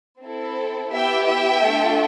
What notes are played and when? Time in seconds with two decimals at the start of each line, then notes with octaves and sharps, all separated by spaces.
0.23 C4 E4 A4
0.93 B3 E4 G4 E5 G5
1.28 E5 G5
1.65 A3 D4 F4 A4